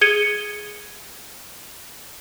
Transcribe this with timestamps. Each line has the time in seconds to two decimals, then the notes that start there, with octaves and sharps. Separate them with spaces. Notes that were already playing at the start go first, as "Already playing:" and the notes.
0.01 G#4 G#6 C#7 D#7 G7